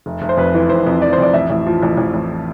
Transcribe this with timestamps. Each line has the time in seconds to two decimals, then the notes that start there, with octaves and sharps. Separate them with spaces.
0.06 F1
0.22 F1
0.29 C5
0.37 F2 B4
0.54 E3
0.69 F1 C5
0.87 F2
1.02 F1 D5
1.13 C5
1.18 F2 D5
1.33 A1 E5
1.50 A1
1.67 F3
1.83 A1
1.97 A1
2.14 A1